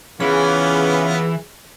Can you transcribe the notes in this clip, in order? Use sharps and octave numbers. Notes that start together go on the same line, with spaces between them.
C#3 E3 B3 C#4 F4 G#4 B5